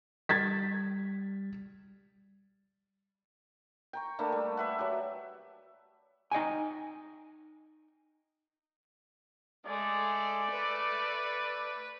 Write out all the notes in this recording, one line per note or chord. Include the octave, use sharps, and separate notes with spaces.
G3 G#6 A6 B6
G5 A#5 C#6
A3 A#3 D4 B5
G3
B4 E5 F#5
F#3 G4
D#4 D#5 G5 G#5
G#3 A3 D5
B4